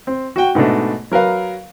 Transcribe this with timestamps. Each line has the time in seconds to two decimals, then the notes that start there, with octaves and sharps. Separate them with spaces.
0.07 C4
0.36 F#4 F#5 G5
0.55 G#2 B2 A3 D4
1.11 F#3 A#4 B4 F5